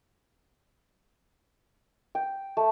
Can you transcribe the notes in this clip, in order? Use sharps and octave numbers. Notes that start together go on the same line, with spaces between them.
G5
A3